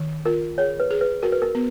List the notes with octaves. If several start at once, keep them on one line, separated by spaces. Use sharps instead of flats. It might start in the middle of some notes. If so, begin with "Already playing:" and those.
Already playing: D#3
F4 A#4
G#4 C#5
B4
G#4
B4
F#4 A#4
B4
A#4
B3